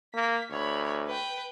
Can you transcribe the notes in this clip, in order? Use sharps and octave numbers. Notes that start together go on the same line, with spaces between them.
A#3 B6
D2 C#5 B5
B4 G5